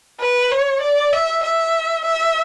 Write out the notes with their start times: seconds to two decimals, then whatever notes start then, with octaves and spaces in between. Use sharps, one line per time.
0.21 B4
0.52 C#5
0.82 D5
1.13 E5
1.44 E5
2.05 E5